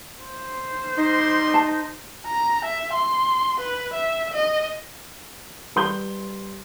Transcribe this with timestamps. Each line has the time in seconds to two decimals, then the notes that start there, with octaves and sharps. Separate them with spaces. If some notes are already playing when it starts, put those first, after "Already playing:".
0.23 C5
0.96 G3 D#4 C6
1.54 A5
2.27 A#5
2.65 E5
2.94 C6
3.60 B4
3.94 E5
4.34 D#5
5.76 G3 B4 C6 G6 G7